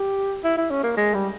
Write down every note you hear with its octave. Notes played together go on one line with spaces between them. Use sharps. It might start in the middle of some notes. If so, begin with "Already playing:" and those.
Already playing: G4
E4
E4
C#4
A#3
G#3
G3